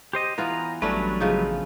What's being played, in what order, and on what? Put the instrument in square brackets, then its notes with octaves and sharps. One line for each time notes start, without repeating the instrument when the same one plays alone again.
[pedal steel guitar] G4 C5 D#5
[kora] E3 B3 F4 [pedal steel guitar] A#5
[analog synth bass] A1 [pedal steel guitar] F#3 G3 B4 [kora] A3 C#4 D4
[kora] C#3 F3 D#4